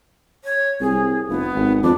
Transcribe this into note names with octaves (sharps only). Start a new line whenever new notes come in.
C#5
C2 G#4
F1 B3
G#1
F2 D4